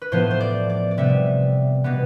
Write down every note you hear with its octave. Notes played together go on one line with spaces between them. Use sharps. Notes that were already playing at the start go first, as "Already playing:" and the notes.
B4
A2 F3 B3 C5
C5
D5
D5
D5
C3 G3 B3 E5
B2 G3 B3